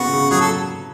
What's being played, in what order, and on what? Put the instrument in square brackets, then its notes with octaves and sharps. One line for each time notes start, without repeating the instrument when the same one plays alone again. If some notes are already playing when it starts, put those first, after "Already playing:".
Already playing: [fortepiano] C#3 B3 [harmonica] F#4
[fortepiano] C#3
[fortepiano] F#3 [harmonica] G#4
[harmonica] A4